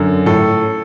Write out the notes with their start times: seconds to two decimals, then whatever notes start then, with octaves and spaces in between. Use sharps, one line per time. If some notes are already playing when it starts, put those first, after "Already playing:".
Already playing: F#2 D3
0.26 A2 A4